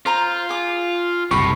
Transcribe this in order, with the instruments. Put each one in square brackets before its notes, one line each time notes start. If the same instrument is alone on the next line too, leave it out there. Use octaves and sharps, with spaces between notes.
[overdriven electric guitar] F4 [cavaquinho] C5 A#5 C6
[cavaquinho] G#4 D6
[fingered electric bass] F#1 C2 [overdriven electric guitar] A2 [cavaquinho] G4 B5 [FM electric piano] C#6